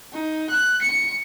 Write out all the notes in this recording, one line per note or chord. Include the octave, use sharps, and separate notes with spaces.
D#4
F#6
C#7